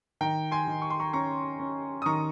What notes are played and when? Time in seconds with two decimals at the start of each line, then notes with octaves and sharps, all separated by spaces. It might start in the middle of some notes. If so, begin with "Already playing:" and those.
0.21 D#3 G5 A#5
0.51 G#5 C6
0.67 D#3
0.82 C#6
0.90 C6
0.99 A#5 C#6
1.13 C#4 A#5 C#6
1.59 C#4
2.02 D#6
2.06 D#3 A#5 C#6